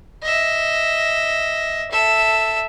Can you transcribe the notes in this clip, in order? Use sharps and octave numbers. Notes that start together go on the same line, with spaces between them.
D#5 E5
A4 E5